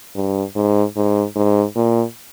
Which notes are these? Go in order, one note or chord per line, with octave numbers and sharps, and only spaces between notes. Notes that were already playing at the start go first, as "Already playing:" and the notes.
G2
G#2
G#2
G#2
A#2